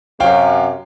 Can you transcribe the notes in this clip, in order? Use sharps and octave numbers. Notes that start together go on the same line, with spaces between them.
F#2 C3 C#5 F5 G5